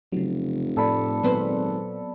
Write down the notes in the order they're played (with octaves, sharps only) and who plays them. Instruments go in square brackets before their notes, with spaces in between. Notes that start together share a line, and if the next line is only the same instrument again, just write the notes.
[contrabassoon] F1 [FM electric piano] C#3 F#3
[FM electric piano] A2 [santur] A4 D5 B5
[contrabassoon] G#1 [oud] A#2 B4 C5 [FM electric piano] F#3 B3 C4